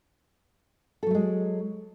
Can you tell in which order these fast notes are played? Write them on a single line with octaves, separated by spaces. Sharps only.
A4 F#3 A3 G#3